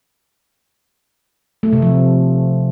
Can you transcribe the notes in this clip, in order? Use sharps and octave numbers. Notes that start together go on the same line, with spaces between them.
A3
C3
F3